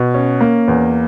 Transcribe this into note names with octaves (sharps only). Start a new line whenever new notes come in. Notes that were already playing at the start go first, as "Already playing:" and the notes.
Already playing: B2
C#4
A#3
E2